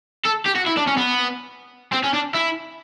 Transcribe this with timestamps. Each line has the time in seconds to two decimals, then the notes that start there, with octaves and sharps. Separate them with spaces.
0.25 A4
0.46 G4
0.55 F#4
0.66 E4
0.77 D4
0.87 C#4
0.97 B3
1.93 C4
2.04 C#4
2.14 D4
2.35 E4